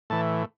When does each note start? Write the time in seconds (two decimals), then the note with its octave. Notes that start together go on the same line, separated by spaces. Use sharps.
0.10 A2 E3 A5